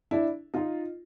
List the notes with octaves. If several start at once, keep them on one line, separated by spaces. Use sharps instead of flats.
D4 E4
D#4 F4